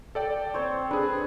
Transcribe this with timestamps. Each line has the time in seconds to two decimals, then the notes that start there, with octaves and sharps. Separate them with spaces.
0.15 A4 D5 G5
0.54 C4 C5 C#5
0.91 D4 G#4 B4